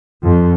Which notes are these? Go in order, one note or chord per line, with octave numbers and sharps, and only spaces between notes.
F2